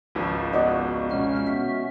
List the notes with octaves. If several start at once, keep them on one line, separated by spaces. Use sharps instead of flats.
G#1 C#2 F3
B3 F#4 D5 D#5 F#5
B2 G#3 C#4 F6
B3 F#4 E5